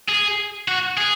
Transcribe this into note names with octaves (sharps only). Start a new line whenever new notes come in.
G#4
F#4
G#4